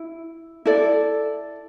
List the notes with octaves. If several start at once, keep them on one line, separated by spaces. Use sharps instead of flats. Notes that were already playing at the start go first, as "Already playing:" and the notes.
Already playing: E4
E4 A4 D5